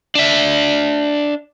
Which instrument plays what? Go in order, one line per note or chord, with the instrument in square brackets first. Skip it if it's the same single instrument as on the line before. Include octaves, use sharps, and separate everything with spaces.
[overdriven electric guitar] D4 E5